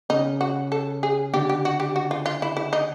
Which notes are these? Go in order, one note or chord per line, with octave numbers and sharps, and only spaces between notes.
C#3 D#4
F#4
A4
G#4
D3 G4
G4
F#4
G4
F#4
F4
F4
E4
E4
D#4